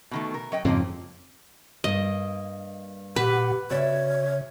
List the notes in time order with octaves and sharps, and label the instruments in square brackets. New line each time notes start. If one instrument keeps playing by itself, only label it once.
[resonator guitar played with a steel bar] B2 D#3 A3
A#4
F#3 D#5 G5
[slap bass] F2 G#2 C#3 [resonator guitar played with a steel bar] F3 A#3 C4
[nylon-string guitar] G2 A#3 [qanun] D#5
[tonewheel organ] A#2 F#5 [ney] G4 [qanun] B4
[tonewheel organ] C#3 [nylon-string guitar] F#4 D5 E5 [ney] C#5